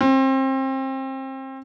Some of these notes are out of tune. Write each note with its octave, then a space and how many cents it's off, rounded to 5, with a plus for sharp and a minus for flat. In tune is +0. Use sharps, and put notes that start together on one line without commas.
C4 +30